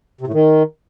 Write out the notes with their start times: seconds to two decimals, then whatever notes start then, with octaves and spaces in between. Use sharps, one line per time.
0.21 C3
0.27 A2
0.34 D#3